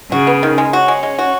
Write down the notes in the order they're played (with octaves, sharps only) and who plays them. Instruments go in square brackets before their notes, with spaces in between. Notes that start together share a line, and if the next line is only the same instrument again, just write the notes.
[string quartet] C#3 [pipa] F#4
[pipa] B3
D#3
G#3
[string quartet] C#4 [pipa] F#4
[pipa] G#3
G#3
F#4